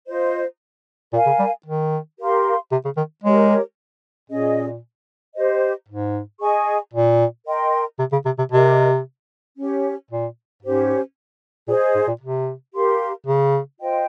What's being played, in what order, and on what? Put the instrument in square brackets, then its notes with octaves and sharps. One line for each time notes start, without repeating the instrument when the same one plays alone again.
[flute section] F4 C5 D#5
[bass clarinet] A#2 [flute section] A#4 F5 G#5
[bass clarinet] C#3
G3
D#3
[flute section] G4 A#4 F5 C6
[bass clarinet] C3
C#3
D#3
[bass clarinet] G#3 [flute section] G4 A#4 C#5
[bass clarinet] A#2 [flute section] C#4 G#4 D#5
[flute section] G4 C5 D#5
[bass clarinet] G#2
[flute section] G#4 D#5 G#5 C#6
[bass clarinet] A#2
[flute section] A#4 D#5 G5 C6
[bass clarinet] C3
C#3
C3
C3
[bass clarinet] C3 [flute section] G4 A#4 D#5
[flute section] C#4 G4 C#5
[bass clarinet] A#2
[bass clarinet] G#2 [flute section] C#4 G4 C5
[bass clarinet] A#2 [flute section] G#4 C5 D#5
[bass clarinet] G#2
A#2
C3
[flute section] G4 A#4 F5 C6
[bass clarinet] C#3
[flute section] F4 C5 D#5 G5